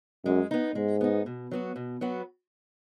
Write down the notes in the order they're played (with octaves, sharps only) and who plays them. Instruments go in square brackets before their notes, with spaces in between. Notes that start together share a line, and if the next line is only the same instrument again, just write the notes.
[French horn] F#2 [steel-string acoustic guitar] G#3
[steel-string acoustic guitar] B3 D#4
[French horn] G#2 [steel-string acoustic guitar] G#3
[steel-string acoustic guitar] B3 D#4
B2
F#3 B3 F#4
B2
F#3 B3 F#4